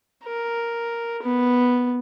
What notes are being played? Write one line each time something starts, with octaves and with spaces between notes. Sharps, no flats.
A#4
B3